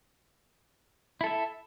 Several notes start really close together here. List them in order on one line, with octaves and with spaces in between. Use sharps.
E4 A4 E5